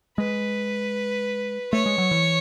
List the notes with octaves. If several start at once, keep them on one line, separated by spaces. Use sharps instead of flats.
G#3 B4
A3 C#5
G#3
F#3
E3